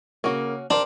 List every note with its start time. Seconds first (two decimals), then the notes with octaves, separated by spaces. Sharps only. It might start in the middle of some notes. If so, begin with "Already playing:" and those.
0.24 C#3 A#3 C#4 F#4
0.70 D4 G4 A#4 C5 C6 D6